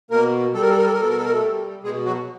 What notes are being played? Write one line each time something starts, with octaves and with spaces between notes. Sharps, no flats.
B2 A#3 A#4
G3 A4
A#4
A4
A#4
A4
A#4
B2 A4
A#4
A4
A#4
A3 A4
G3
B2 G#3 G#4
F#3 F#4